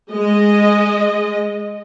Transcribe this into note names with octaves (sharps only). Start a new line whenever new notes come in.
G#3 D#5